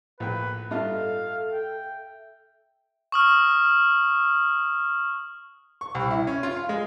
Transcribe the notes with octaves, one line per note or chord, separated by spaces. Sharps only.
A#1 A2 B4 G5
G2 D#4 F4 A4 E5 F5
G5
C#6 D#6 F6
C#6
C2
E4
C#4
F4
F5
G#3